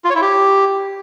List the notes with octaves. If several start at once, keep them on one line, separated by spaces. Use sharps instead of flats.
F4
C#5
E4
G4